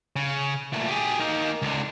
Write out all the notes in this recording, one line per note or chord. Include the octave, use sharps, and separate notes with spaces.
C#3
A#2 A3
G4 G#4
A#3 D#4
C#2 D3